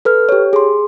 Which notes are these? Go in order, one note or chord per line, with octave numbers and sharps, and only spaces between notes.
A4 B4 F6
G4 C#5
G#4 C6